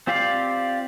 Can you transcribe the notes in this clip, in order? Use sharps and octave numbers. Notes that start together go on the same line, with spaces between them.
C4 F4 G4 D5 F5